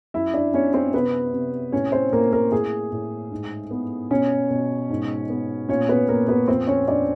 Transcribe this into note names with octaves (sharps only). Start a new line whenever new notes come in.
F#2 E4 E5
D4 D5
B3 C#4 C#5
C4 C5
C3 B3 B4
C3
A2 C#4 C#5
C4 C5
A2 A#3 A#4
A#3 A#4
A2 G#4
A2
G#2
B3
B2 C#4 C#5
B2
G#2
B3
A#2 C#4 C#5
B3 B4
A#2 A#3 A#4
B3 B4
F2 C4 C5
C#4 C#5
F2 D4 D5